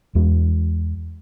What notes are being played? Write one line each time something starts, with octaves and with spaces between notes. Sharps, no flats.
E2 G#3